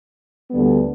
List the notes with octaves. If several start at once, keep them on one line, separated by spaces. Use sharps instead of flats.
D2 D3 G3 B3